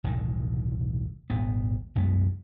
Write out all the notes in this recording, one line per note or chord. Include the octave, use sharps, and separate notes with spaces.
E1 C2 A2 D#3
D#1 G#1 B3
C2 F#2 G#3 B3